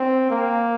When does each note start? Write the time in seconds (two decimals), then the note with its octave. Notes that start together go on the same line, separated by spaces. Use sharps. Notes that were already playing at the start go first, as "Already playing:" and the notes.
Already playing: C4
0.30 A#3